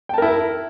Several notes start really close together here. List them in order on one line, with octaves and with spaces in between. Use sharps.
G5 A5 A#4 E4